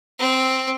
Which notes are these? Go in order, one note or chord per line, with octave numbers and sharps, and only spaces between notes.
C4